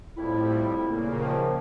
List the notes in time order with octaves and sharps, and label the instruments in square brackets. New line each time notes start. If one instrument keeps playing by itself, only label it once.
[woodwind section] F2 E4 [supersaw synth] A2 G3
[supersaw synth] A#2 C#3 A#3
[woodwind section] D#3 F3